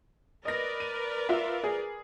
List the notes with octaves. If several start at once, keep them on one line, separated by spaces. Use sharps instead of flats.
A#4 B4 D5 D#5 A#6
D#7
F4 E5
G#4